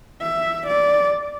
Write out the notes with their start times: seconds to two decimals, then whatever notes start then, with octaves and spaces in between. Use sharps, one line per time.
0.22 E5
0.67 D5